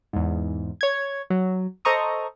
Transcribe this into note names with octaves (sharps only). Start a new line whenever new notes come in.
E2 G#2
C#5 G#6
F#3
A4 C5 D#5 A#5 C#6 D#6